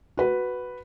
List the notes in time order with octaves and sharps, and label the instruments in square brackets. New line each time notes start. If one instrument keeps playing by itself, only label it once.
[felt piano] F#4 B4